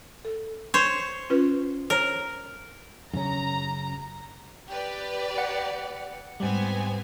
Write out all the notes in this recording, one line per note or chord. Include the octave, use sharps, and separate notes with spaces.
A4
C5 C#5
C#4 F4 B4
A#4 C5 C#5 A#5
F#2 C#3 C#4 A#5
G4 B4 D5
F#5 C#7
G#2 G3 B3 C4 G#5